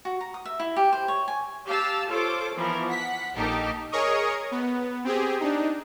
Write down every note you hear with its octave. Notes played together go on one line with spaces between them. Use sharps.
F#4
A#5
D#6
E5
E4
G4
C5
C#5
G#5
G4 F5 A5 E6
F4 A4 C5 C#5 D6
E3 F3 B3 A#4
F#5 B6
A#1 A#3 D#4 G4 A4
G#4 A#4 C#5 D#5 C#6 D#6
B3
C4 G4 G#4
D4 D#4